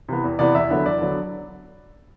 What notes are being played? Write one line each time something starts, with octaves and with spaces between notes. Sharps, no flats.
C3 E3 B3
E2
C3 E3 B3 D5
E2 E5
D3 F#3 B3
E2 D5
D3 F#3 B3